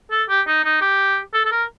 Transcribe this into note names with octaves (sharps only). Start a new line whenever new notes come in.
A4
G4
D#4
D#4
G4
A4
A4
A#4